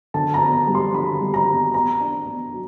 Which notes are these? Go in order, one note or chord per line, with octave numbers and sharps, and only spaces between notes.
D3 A5
A#5
B3
G3
C6
D3 B5
G3
A#5
B3
B3 A#5
D4
B3
F#3